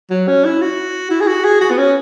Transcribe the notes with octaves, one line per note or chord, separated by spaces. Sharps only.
F#3
C#4
E4
F#4
E4
G#4
F#4
G#4
F#4
B3
C#4